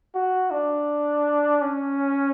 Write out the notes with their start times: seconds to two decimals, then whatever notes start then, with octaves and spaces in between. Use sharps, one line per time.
0.15 F#4
0.51 D4
1.61 C#4